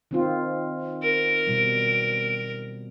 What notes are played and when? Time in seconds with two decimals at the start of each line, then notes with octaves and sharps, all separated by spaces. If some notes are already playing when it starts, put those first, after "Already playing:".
0.11 D#3 C4 F4
1.03 A#4 D7
1.47 B2 G3